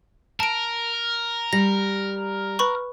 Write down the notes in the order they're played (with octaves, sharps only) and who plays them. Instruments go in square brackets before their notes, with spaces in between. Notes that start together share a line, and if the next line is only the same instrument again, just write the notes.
[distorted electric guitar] A#4 [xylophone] A5 D7
[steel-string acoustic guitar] G3 [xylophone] A#6
[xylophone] B4 B5 C#6